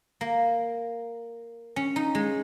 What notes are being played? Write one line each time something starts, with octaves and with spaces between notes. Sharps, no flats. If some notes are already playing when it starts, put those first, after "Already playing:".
A#3
C#4
D#4
G#3